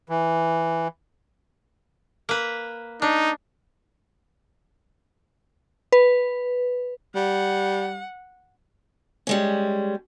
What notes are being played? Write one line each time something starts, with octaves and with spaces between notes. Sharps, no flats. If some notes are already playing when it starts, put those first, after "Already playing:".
E3
A#3 B4
D4 D#4
B4
G3 F#5
G3 G#3 C#4